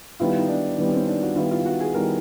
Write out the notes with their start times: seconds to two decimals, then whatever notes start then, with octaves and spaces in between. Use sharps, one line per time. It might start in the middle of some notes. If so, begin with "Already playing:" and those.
0.20 D#3 G3 B3 E4 F4
0.38 D#4
0.49 D4
0.78 D#3 G3 B3 E4
0.88 C#4
0.93 C4
1.07 D4
1.22 F#4
1.36 D#3 G3 B3 E4 F4
1.51 F4
1.65 F#4
1.80 G#4
1.94 D#3 G3 B3 E4 A#4